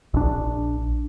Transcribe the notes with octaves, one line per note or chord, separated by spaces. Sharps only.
A#1 D4